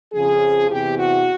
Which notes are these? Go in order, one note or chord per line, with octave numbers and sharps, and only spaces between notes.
F2 C#3 F3 G#4
E2 C3 E3 G4
F#4